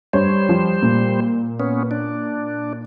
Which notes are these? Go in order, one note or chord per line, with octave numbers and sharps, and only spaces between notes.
G2 G3 C5 C#5
F3
A#2
B3 C#4
D4